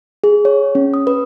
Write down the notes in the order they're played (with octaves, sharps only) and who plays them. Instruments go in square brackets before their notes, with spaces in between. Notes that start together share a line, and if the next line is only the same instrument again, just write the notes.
[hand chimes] G#4
C#5
C#4
D#6
B4